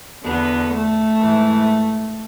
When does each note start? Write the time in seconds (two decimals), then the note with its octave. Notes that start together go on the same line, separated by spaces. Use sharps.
0.24 E2 D3 B3
0.73 A3
1.20 G#2 E3